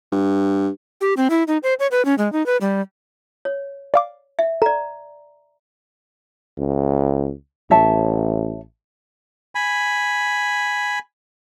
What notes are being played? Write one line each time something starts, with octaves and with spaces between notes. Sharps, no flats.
G2
G4
C4
E4
D#4
C5
C#5
B4
C#4
G#3
D#4
B4
G3
C#5
D5 F5 D6
E5
A4 D5 A#5
C#2
A1 C#5 E5 A5
G#5 B5